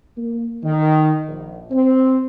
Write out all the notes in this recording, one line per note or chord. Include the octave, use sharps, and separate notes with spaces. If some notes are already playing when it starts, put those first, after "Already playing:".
A#3
D#3
A#1
C4